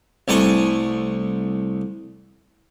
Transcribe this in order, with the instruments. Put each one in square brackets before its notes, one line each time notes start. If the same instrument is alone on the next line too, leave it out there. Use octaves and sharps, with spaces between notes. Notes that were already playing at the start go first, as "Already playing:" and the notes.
[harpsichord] C2 A3 G#5 C#6